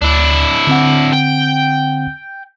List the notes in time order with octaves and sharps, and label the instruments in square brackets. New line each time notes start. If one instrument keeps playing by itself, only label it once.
[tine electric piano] D2 [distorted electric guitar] D4 E4
[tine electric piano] D3 C4 F#5
[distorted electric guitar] G5